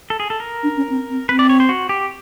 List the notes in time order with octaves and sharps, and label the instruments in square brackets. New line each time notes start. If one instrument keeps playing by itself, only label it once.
[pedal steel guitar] A4
G#4
A4
A#4
[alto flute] D4
C#4
C4
C4
[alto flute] C4 [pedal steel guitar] B4
[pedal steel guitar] D5
C#5
C5
F#4
G4